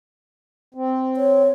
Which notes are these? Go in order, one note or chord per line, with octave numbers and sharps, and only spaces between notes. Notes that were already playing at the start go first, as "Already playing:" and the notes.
C4
C#5